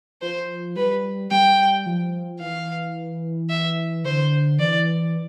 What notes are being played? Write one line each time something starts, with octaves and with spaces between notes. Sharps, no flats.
F3 C5
G3 B4
G3 G5
F3
E3 F5
E5
D3 C5
E3 D5